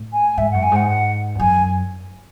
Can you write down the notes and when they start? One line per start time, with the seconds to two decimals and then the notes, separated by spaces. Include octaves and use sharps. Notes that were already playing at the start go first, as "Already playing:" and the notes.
Already playing: A2
0.13 G#5
0.38 G#2 E5
0.51 F#2 F#5
0.63 G#5
0.72 G#2 F#5
0.88 F#5
1.35 E2
1.40 F#2 G#5